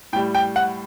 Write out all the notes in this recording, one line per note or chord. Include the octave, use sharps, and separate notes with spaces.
A2 G3 G5
G5
F#5